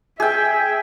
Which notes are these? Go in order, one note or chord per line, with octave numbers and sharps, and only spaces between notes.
G#4 E5 G5